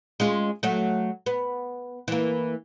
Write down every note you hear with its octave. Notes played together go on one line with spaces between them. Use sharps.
G#3 C#4 F4
F#3 A3
B3
E3 A#3